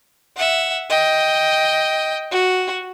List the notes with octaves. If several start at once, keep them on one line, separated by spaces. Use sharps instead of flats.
E5 F#5
D#5 G5
F#4